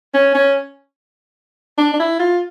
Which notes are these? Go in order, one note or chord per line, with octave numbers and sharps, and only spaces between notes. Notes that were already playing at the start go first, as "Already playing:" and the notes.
C#4
C#4
D4
D4
E4
F4